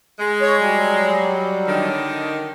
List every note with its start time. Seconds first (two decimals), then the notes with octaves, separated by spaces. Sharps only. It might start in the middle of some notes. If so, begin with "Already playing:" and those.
0.19 G#3
0.42 C#5
0.59 F#3 G3
1.68 D3 D#3